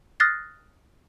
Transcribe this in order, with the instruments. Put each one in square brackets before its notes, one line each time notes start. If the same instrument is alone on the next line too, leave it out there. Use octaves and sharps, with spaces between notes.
[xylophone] D#6 F6 F#6 A6 A#6 C7